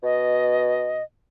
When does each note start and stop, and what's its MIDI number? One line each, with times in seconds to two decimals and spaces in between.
0.03 0.99 47
0.03 1.03 75